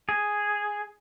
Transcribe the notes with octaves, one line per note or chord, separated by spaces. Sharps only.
G#4